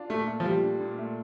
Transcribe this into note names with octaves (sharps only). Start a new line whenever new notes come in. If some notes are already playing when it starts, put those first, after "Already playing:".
Already playing: D4 F4
A#2 A3
A3
F3
G3 F4
D4
A#2
A3